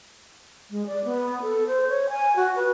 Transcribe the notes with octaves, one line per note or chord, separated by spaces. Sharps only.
G#3
D5
B3
A4
C5
C#5
G#5
F#4
B4